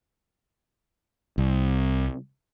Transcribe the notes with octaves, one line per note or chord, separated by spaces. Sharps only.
C2